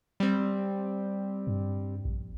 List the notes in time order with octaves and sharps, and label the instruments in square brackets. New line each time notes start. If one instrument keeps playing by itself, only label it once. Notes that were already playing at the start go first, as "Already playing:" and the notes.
[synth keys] G3 C4
[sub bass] G2
A#1